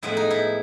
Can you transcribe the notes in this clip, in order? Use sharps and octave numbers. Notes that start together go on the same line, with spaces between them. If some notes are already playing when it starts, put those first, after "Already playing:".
A2 F3 G#3 B3 E4
D#4
E4